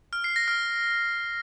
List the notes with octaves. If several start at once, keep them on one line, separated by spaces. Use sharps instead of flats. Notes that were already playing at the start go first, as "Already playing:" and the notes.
F6
C7
A#6
F6